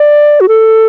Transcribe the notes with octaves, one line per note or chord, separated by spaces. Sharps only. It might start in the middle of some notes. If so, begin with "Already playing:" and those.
Already playing: D5
F#4
A4